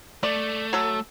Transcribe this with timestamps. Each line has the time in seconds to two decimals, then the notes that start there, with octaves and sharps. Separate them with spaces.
0.23 A3 D5
0.73 F#3 A4